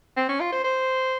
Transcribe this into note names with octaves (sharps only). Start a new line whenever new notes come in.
C4
C#4
F4
C5
C5